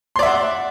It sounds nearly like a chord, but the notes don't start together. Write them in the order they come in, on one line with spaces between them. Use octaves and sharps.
C6 D5 E5 F#5